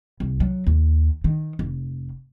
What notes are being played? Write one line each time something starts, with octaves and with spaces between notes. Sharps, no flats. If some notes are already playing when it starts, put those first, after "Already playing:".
C2
F#3
D#2
D#3
F1